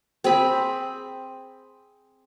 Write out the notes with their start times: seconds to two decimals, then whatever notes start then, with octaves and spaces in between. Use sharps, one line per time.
0.24 C4 G#4 B5